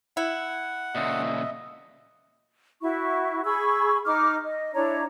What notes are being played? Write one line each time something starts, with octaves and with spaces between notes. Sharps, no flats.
E4 F#5
A#2 C#3 D#5 E5
E4 F#4 C#6
G#4 B5 C#6 E6
D#4 D6 F6
D#5
D4 E4 C#5 A#5